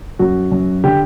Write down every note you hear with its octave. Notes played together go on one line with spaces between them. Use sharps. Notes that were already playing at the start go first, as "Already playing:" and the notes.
F#2 F#4
F#2
D3 G4